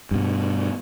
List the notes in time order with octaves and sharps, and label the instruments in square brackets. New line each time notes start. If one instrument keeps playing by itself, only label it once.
[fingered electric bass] G2 B2